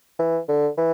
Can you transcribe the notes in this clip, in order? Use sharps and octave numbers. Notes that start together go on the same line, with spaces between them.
E3
D3
E3